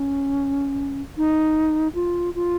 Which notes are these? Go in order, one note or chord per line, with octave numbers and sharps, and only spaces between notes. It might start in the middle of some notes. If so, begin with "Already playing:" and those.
Already playing: C#4
D#4
F4
F4